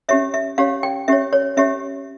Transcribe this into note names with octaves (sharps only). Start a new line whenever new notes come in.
C#4 G4 C#5 E5
E5
C#4 G4 C#5 F5
G5
C#4 G4 C#5 E5
C#5
C#4 G4 C#5 E5